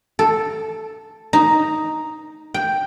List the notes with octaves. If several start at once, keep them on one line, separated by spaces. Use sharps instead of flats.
A4
D#4
G5